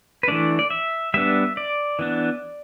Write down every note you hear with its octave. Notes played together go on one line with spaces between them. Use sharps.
B4
E3 A3 D4 D5
D5
E5
G3 B3 D4 E5
D5
E3 B3 D4